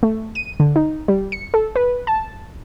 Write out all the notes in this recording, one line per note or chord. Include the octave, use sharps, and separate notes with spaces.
A3
D#7
D3
D#4
G3
C#7
A4
B4
A5